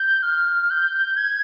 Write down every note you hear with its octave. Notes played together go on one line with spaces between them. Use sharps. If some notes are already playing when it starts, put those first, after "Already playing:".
Already playing: G6
F6
G6
G#6